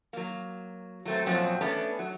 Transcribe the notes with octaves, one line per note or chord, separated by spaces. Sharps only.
F#3 A#3
F#3 A3 C4
F#2 A#2 F3 F#3 C4
A3 B3 C#4 D4
F#3